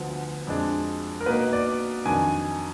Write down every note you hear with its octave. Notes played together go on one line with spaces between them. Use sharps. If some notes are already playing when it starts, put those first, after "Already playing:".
Already playing: D2 D3 F3 B3
F2 F3 G#3 D4
A#4
B2 A#3 D#4 B4
D5
F2 D#3 F#3 D4 G#5